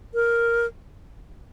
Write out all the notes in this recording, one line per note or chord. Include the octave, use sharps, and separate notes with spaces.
A#4